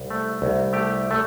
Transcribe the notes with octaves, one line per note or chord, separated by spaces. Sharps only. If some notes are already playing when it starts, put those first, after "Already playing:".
Already playing: C2
A3
C2
A3 G4
A3